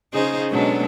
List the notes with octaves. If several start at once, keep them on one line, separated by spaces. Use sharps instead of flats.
C#3 D#4 F4 G#4 C5
B2 F#3 G#3 C#4 D4 A4